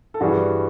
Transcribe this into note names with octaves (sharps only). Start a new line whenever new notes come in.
A4
G2 E3 G3 F#4 G#4